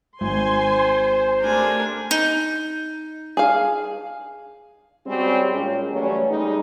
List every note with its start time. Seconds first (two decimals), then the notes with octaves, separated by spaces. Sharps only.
0.21 G#1 C5 G#5 C6
1.42 A3 D4 G4 A#4 G#5
2.11 D#4
3.37 G#4 F5
5.06 G3 G#3 C4 C#4 F#4 G4
5.51 A#2 G#3 C#4
5.92 E3 F#3 G3 A3 C#4
6.28 G3 G#3 D#4